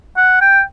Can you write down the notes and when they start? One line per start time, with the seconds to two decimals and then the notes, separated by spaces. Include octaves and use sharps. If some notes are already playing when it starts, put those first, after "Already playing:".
0.17 F#5
0.41 G5